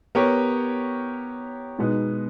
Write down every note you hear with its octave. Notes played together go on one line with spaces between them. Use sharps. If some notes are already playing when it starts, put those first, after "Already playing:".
B3 G4 A#4 C#5
B2 G#3 B3 D#4